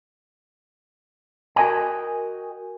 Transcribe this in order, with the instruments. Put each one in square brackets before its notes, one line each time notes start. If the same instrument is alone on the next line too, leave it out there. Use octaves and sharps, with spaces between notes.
[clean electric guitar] F#4 A#4 C5 D#5 G5 G#5